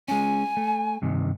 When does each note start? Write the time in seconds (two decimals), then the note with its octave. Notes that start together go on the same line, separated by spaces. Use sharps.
0.08 G#3 C#4 G#5
0.57 A3
1.02 G2 C3 D#3